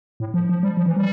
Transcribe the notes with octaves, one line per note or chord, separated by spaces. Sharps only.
A2
F3
F3
G3
F3
E3
G3